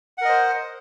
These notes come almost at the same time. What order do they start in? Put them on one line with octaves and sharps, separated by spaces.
F#5 A#4 D#5 C5